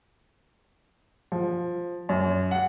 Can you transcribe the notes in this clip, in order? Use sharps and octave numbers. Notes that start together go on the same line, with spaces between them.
F3
F#2
F#5